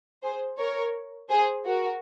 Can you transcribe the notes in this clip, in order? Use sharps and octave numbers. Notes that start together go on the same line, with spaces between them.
G#4 C5
A#4 C#5
G#4 C5
F#4 A#4